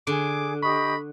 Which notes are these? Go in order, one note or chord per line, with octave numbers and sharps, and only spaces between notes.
D3 G#4 D6
G4 D#5 B5 C#6 D#6